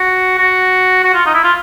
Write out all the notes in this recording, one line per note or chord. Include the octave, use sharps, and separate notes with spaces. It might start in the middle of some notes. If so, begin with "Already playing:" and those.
Already playing: F#4
F#4
F#4
F4
D#4
E4
F4